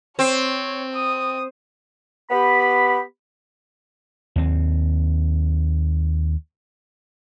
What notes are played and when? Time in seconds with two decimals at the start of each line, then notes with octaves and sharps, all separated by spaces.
0.19 C4 C#5
0.94 D#6
2.30 B3 G4 B5
4.36 D#2 C4